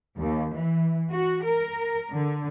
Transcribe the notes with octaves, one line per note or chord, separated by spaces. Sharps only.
D#2
E3
F#4
A#4
D3